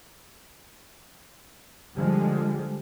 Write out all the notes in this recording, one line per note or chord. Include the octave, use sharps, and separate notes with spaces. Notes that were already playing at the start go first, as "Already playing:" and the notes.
D3 F3 G3 G#3